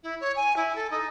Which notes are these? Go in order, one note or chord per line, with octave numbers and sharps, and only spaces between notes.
E4
C#5
G#5
E4
A4
D#4